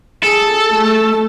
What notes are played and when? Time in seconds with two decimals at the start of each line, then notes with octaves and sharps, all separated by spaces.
0.24 G#4 A4
0.72 A3